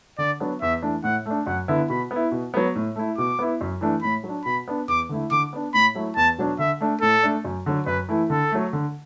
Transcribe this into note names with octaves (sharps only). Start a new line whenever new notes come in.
D3 D5
F#3 B3 D4
E2 E5
E3 A3 D4
A2 F#5
A3 D4
F#2 F#5
D3 B3 E4
B2 B5
B3 E4
B2
F#3 B3
A2
A3 E4
B2 D6
B3 E4
F#2
E3 A3 D4
A2 B5
F#3 D4
B2 B5
B3 D4
E2 D6
D3 A3 E4
D3 D6
B3 D4
A2 B5
F#3 A3 E4
E2 A5
B2 F#3 D4
D3 E5
A3 D4
A2 A4
A3 D4
F#2
D3 F#3
F#2 B4
E3 A3 E4
D3 A4
F#3 A3
D3